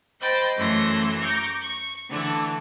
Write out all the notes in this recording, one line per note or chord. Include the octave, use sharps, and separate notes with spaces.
C5 D#5 G5 B5 A6
F#2 E3 A3 C6 A#6
A#5 C#6 D6 G6
C#6
D3 E3 A3